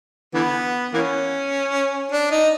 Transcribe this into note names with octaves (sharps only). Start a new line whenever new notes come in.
D3 E3 B3
E3 A#3 C#4
D4
D#4